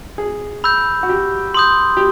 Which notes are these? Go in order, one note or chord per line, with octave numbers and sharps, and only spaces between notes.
G#4
B5 E6 G6
F#4
G4
C6 D#6 G6
G4